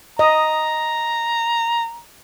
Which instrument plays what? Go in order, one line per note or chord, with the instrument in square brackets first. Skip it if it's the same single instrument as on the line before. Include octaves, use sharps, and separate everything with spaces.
[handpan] D#5 [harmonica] A#5